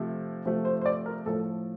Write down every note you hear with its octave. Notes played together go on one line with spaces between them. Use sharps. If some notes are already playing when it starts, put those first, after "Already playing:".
Already playing: C3 F3 A3
C3 F3 A3
C5
C5
D5
A#4
A2 F3 A3 A4